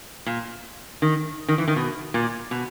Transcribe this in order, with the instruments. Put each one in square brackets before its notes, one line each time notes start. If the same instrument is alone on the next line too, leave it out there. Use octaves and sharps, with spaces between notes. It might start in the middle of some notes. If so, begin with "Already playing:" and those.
[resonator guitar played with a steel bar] A#2
D#3
D#3
E3
D#3
B2
A#2
B2